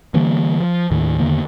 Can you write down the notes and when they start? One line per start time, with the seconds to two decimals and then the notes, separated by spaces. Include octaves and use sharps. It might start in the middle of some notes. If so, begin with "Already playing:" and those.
0.14 D3 E3 G3 A#3
0.61 F3
0.91 D#2 A2 D#3
1.19 E2 D3 D#3 A#3